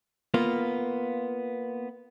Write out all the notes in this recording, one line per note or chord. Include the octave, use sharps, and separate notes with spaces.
A#3 B3 F4